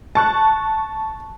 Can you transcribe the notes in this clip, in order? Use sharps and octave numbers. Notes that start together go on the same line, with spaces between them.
A5 C#6 F#6